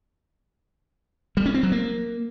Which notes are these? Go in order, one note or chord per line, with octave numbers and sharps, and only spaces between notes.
G3
C#4
C4
F#3
A#3